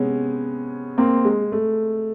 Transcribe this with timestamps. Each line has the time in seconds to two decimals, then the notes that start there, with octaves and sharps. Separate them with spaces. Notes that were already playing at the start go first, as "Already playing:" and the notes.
Already playing: C3 G#3 B3 C#4
0.98 A#3 C4
1.25 G#3
1.52 A3